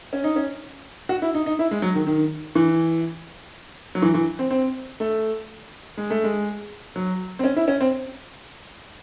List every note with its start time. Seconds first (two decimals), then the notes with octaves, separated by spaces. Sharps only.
0.13 C#4
0.24 D#4
0.36 C#4
1.09 F#4
1.22 E4
1.34 D#4
1.46 D#4
1.59 E4
1.71 G#3
1.82 F#3
1.95 D#3
2.07 D#3
2.55 E3
3.95 F#3
4.02 E3
4.14 E3
4.39 C4
4.51 C4
5.00 A3
5.97 G#3
6.10 A3
6.24 G#3
6.96 F#3
7.39 C4
7.44 C#4
7.56 E4
7.68 C#4
7.81 C4